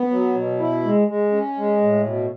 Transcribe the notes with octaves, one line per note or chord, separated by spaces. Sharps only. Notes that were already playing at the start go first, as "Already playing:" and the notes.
Already playing: B3
F#3
B2
E4
G#3
G#3
C#4
G#3
A2
B2